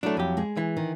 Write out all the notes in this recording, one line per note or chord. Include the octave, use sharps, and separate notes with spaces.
F#3 A3 D4 E4
F2 G4
G#3 G#4
E3
D#3